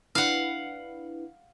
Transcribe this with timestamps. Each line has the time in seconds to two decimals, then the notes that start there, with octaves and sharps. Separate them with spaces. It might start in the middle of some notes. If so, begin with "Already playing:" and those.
0.15 D4 E4 B4 F5 F#5